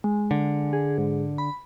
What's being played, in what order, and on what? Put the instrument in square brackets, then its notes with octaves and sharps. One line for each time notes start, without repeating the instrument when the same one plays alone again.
[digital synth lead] G#3
[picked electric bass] D3
[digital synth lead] G#4
G#2
B5